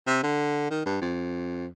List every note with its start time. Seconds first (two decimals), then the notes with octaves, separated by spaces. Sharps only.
0.07 C3
0.23 D3
0.71 D#3
0.86 G2
1.01 F2